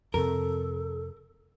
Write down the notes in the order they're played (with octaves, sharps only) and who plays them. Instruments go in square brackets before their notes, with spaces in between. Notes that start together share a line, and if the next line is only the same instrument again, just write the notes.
[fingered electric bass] F2 C3 [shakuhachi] A4 [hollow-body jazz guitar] A#4